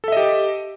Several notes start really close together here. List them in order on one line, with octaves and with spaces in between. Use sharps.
A4 E5 D#5 G4